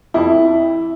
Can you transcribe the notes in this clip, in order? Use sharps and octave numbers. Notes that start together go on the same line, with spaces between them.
F2 E4